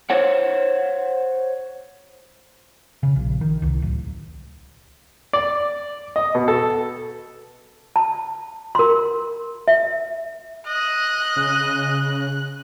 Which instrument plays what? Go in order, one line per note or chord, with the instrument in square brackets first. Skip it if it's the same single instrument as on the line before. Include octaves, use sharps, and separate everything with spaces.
[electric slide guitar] C5 C#5 F#5
[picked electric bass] C#3
A#1
D#3
C2
D1
[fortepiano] D5
D#5
B2
A4
[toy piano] A5
A#4 C6
E5
[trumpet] D#5 [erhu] F#6
[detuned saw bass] C#3